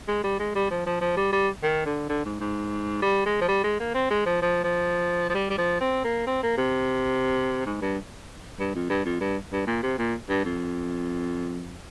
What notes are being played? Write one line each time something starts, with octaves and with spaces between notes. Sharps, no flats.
G#3
G3
G#3
G3
F3
F3
F3
G3
G3
D#3
D3
D3
G#2
G#2
G3
G#3
F3
G3
G#3
A#3
C4
G#3
F3
F3
F3
F3
G3
G3
F3
C4
A#3
C4
A#3
C3
G#2
G2
G2
F2
G2
F2
G2
G2
A#2
C3
A#2
G2
F2